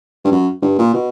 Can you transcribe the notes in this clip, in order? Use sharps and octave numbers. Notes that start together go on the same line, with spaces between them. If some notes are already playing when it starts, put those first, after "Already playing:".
G2
F#2
G2
A#2
B2